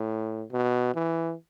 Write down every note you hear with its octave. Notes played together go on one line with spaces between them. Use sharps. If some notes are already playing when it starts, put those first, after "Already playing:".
Already playing: A2
B2
E3